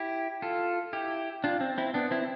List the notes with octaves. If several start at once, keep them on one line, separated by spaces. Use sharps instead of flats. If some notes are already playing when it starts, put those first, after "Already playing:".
Already playing: E4 G4
F4 A4
E4 G4
D4 F4
C4
C4 E4
B3 D4
C4 E4